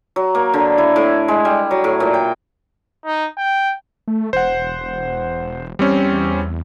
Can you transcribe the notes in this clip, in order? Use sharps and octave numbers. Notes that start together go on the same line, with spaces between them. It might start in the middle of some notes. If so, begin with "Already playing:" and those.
F#3
A#3
D3
E4
A2
G#3
G3
F#3
A2
A#2
G5
D#4
G5
A3
E1 C5 F#5
E2 G3 C4 C#4